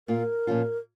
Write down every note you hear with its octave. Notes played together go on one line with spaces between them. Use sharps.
A#2 A#3 F4 A#4
A#2 F3 C#4 F4